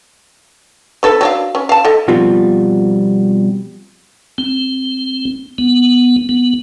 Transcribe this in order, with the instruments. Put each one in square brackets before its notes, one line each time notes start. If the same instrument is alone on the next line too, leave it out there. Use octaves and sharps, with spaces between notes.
[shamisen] C4 A4 B4
F#3 D4 F5
C#4
F5 A5
A4 D#5
[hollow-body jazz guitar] B2 F3 G3 C4 F4 F#4
[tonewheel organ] C4
B3
B3